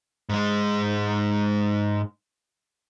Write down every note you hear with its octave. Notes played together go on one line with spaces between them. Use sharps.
G#2 G#3